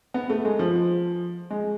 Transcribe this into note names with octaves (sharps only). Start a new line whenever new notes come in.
B3
A3
G#3
F3
G#3